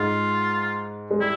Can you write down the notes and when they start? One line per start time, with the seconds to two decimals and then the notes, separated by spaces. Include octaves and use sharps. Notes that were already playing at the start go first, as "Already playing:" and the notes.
Already playing: G#2 G#3 F4
1.11 G#3
1.20 G3 E4